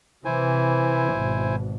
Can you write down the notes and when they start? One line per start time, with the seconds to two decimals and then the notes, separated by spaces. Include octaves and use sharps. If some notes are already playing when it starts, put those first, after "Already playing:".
0.25 C3 E3 E4 C5 G#5
1.13 G#1 B2